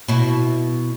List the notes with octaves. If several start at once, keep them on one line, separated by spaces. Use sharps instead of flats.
B2 E4